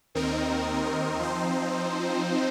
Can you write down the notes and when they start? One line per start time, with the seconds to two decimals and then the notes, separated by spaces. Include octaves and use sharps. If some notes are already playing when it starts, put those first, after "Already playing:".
0.15 D#2 D#3 C4 D#4 A#4
1.19 F3 C4 D#4 C5